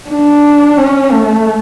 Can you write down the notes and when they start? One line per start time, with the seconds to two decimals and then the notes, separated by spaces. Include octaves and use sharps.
0.10 D4
0.77 C#4
1.12 A3